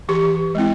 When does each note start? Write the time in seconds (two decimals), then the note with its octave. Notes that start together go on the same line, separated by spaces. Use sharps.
0.09 E3 G4
0.55 G#3 C4 E4